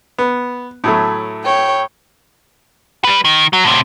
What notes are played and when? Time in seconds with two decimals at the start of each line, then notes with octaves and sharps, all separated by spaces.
0.19 B3
0.84 A2 F#3 A3
1.44 C#5 G5
3.04 G3 B4
3.25 D#3
3.53 F#3
3.64 A2 C3